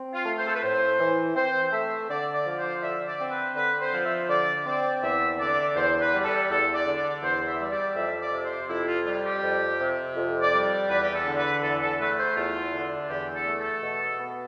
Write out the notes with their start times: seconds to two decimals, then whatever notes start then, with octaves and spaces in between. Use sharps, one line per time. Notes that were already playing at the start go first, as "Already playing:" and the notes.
Already playing: C4
0.14 F4
0.26 A3
0.39 C5
0.47 A4
0.55 B4
0.63 A2 C5
1.00 E3
1.36 C4 C5
1.72 A3 E5
2.10 D3 D5
2.34 D5
2.46 F3
2.58 C5
2.82 D3 E5
3.08 D5
3.20 C4
3.31 B4
3.56 D3 B4
3.81 C5
3.94 F3
4.05 E5
4.29 D3 D5
4.66 C4 D5
5.03 E2 E5
5.39 D3 D5
5.76 E2 C5
6.01 B4
6.13 G3
6.25 A4
6.50 E2 A4
6.74 D5
6.86 D3
6.98 D5
7.22 E2 C5
7.47 E5
7.60 G3
7.71 D5
7.96 F2 E5
8.21 D5
8.33 C3
8.45 C5
8.69 F2 E4
8.88 F4
9.06 G3 F4
9.25 G4
9.44 F2
9.80 C3
10.17 F2
10.42 D5
10.53 G3
10.89 E2 B4
11.03 G4
11.15 A4
11.26 D3
11.38 B4
11.63 E2 A4
11.81 A4
12.00 A3 B4
12.19 C5
12.37 E2 F4
12.73 D3
13.09 E2 G4
13.35 A4
13.46 A3
13.59 A4
13.83 B2
14.20 B3